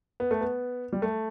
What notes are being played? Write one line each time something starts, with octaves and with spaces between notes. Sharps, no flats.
B3
A3
B3
G3
A3